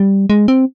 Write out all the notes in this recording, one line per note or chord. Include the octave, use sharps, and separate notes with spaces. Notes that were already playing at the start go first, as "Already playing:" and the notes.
Already playing: G3
G#3
C4